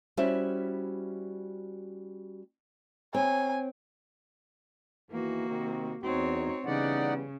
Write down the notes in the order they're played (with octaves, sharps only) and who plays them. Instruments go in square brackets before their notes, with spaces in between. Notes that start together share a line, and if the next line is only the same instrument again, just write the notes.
[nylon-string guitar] G3 C#4 E4 F#4 C5 E5
[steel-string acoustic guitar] C4 C#5 [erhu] G#5
[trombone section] E2 D#3 E3 [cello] A#3 F#4
[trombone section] C3 D#3 C4
[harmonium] E2 [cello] C4 C#5 [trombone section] D#4 F#4
[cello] C#3 [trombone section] E3 G3 B3 [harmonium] D#4 D5 F#5